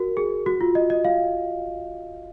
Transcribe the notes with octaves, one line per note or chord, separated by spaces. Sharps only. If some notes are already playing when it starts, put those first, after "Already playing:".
Already playing: F#4 A#4
G#4
F#4
F4
D#5
D#5
F5